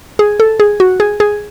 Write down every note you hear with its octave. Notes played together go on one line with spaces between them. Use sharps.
G#4
A4
G#4
F#4
G#4
G#4